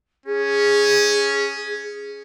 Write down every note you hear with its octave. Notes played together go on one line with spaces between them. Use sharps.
C#4 G#4